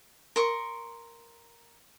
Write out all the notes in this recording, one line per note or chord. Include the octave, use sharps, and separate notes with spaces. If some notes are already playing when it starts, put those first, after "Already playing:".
A#4 C6 C#6 D#6